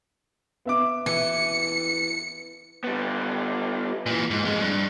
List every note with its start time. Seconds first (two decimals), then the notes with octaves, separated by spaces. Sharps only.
0.65 B3 E5 D6
1.06 E3 C#7
2.84 G3 B3
4.06 A#2 E3
4.31 G#2
4.45 F2 G#3
4.61 G2